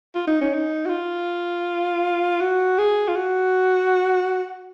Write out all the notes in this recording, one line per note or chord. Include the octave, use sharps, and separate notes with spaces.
F4
D#4
C#4
D#4
F#4
F4
F#4
G#4
F4
F#4